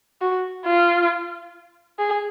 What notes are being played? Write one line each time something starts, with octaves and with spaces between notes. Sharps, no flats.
F#4
F4
G#4